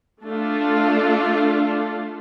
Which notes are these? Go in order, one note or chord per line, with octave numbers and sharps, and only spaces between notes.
A3 D4 F4